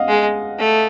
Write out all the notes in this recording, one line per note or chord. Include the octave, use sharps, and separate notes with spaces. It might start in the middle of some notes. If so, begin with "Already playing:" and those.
Already playing: D#5 F5 F#5
G#3
A3